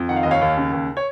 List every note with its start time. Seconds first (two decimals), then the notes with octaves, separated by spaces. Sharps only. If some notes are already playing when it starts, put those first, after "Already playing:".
Already playing: F2
0.09 D#3 F#5
0.16 F5
0.23 D#2 D#5
0.31 C#5 F5
0.41 D#2
0.58 C#3
0.73 D#2
0.97 C#5